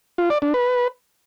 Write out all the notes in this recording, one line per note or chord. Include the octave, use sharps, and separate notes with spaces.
F4
D5
D4
B4